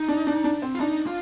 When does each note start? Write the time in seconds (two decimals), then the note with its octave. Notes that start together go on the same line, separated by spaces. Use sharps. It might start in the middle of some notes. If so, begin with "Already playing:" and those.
Already playing: D#4
0.08 D4
0.27 D4
0.44 D4
0.62 C4
0.75 F4
0.80 D4 D#4
1.07 F4